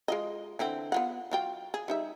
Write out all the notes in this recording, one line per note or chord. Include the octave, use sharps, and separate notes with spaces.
G#3 F4 D#5
D3 E3 C4
B3 F4 F#5
F#3 F4 G5
G#4
G3 D#4 E5